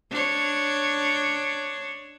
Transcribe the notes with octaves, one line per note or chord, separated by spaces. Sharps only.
D4 C#5